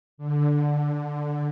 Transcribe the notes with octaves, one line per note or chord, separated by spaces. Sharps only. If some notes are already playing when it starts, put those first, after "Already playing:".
D3